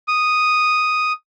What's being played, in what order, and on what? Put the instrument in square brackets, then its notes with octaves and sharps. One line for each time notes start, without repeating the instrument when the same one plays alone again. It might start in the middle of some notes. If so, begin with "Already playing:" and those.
[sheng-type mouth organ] D#6